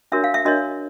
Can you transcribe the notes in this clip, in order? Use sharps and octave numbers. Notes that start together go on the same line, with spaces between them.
D4 F#4 A#4 C#5 E5
F5
E5
D4 F#4 A#4 C#5 D#5